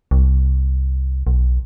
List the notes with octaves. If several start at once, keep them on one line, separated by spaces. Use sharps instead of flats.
C2
B1